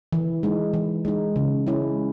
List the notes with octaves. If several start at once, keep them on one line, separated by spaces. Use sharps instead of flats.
E3
G#3 D#4
E3
G#3 D#4
C#3
G#3 C#4 E4